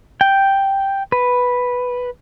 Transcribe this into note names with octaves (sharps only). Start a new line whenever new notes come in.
G5
B4